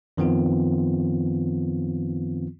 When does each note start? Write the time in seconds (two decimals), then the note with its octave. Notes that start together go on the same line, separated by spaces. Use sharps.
0.17 F#2 D#3 F3 B3 C4 F4